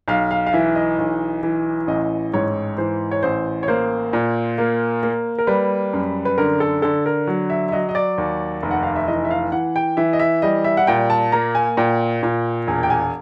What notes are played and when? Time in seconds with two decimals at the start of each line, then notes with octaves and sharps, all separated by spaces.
0.08 B1 F5
0.31 F5
0.46 F5
0.53 E3 E5
0.75 D#5
0.98 B1
1.43 E3
1.87 A1 D#5
2.34 G#2 C#5
2.78 E3 C5
3.11 C#5
3.23 A1 C5
3.63 C#5
3.68 A#3 C5
4.13 A#2
4.58 A#3
5.03 A#3
5.38 A#4
5.47 G3 B4
5.93 F#2
6.25 B4
6.38 D3 A#4
6.60 A4
6.82 D3 A4
7.06 A#4
7.27 F#3
7.50 E5
7.69 E5
7.72 F#3 D#5
7.89 D#5
7.95 D5
8.18 D#2
8.63 F1
8.71 F#5
8.83 F5
8.96 E5
9.07 E3 D#5
9.25 E5
9.31 F5
9.52 E3 F#5
9.76 G5
9.97 E3 E5
10.13 D#5
10.19 E5
10.42 G3 D#5
10.64 E5
10.77 F#5
10.87 A#2 G5
11.10 A5
11.32 A#3 A#5
11.55 G#5
11.77 A#2 G5
12.23 A#2
12.67 E1 G#5
12.83 G5
12.90 G#5